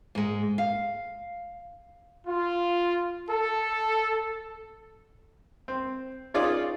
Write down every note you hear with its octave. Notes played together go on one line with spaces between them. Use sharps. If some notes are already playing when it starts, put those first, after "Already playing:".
G#2 G#3
F5
F4
A4
C4
C#4 D#4 F4 G#4 D5